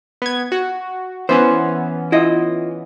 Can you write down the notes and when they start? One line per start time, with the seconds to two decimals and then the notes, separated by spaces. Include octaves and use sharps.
0.22 B3 G#6
0.52 F#4
1.29 E3 B3 C#4 C5
2.12 E4 F4 D#5